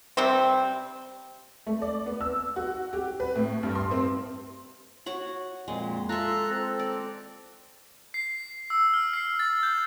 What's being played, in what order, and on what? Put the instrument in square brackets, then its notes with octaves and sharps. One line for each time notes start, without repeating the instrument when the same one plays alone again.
[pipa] C3 G3 C4
[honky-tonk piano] A3
D5
B3
E6
F#4
G4
B4
A2
G2
C6
C4
[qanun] F#4 C#5 F#5
[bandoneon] F2 A#2 [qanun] G#3
[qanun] F4 E5 [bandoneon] A4 A#5 F#6
[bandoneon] C4 A4
[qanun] D5
[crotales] C7
E6
F6
C7
A6
G6